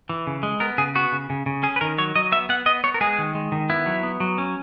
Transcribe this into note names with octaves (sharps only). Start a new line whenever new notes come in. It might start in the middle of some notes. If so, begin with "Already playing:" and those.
E3
C#3
G#3
B3 A#4
C#3 G#4
B3 F#4
C#3
C#3
C#3
C#4 G#4
B4
D#3 A#4
F#3 C#5
F#3 D#5
B3 E5
B3 F#5
B3 D#5
B3 C#5
A#4
G#3 G#4
D#3
G#3
D#3
B3 E4
F#3
B3
F#3
C#4